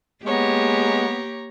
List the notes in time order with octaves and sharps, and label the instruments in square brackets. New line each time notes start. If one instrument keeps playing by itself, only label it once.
[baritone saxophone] G#3 [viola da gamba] A#3 G4 [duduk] B3 [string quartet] C#5 A#5